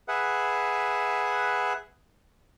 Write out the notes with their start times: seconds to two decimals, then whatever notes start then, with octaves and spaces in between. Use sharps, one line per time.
0.08 G#4 B4 E5 F#5